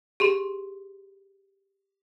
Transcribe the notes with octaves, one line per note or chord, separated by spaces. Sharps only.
G4 G#4 C6